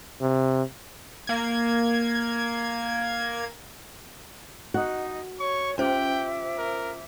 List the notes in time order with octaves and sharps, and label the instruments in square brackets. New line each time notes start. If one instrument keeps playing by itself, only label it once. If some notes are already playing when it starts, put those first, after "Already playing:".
[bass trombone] C3
[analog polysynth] A#3 G#6
[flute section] D#4 D#5 [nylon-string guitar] F#4 F#5
[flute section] C#5 [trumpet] C#6
[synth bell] C#4 C5 [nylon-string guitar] F4 G4 [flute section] E5 D6 [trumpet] G5
[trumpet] A#4